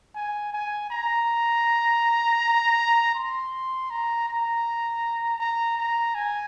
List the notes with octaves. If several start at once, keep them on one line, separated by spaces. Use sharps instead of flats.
G#5
G#5
A#5
C6
A#5
A#5
A#5
A#5
G#5